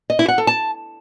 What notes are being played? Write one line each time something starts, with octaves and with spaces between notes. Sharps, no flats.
D#5
E4
F#5
A4
A5